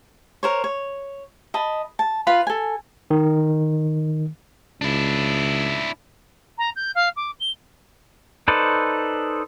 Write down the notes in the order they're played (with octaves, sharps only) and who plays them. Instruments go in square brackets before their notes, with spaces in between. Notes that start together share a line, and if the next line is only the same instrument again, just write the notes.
[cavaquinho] A#4 C5 C#5
C#5
D#5 A5 B5
A5
F4 B4 F5 B5
A4 G#5
[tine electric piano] D#3
[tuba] C#2 [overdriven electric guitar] D4 E4
[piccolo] A#5
G6
F5
D6
G7
[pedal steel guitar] D#4 A4 B4 C5 D5